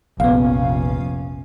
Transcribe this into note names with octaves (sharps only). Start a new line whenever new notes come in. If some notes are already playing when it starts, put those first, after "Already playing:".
F1 A#1 B3 C#4 F5